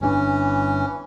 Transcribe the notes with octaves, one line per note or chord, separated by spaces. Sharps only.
G1 C3 E3 C#4 D4